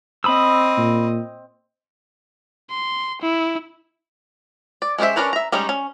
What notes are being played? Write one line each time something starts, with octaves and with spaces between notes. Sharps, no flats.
C4 D#5 B5 D#6 E6
A#2
C6
E4
D5
G#3 C#4 G4 C5 E5
C#4 D4 A#4 B4 C#5
E5 A#5
G3 G#3 C#4 D#4 C#5
C#4